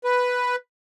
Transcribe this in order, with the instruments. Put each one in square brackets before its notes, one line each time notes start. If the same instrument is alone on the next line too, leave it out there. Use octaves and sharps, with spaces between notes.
[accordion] B4